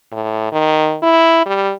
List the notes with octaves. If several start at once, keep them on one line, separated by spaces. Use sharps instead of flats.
A2
D#3
E4
G3